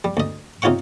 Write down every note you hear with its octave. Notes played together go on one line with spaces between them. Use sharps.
G3
D2 D#5
C3 D#4 F4 C#5 F#5 C#6